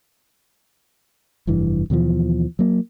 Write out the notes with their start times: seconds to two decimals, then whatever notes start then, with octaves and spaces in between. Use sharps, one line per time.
1.47 F1 G2 E3
1.90 D#2 B2 E3 F3
2.59 F#3 A#3